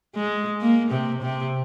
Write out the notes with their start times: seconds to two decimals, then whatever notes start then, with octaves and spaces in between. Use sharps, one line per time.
0.15 G#3
0.61 A#3
0.91 C3
1.22 C3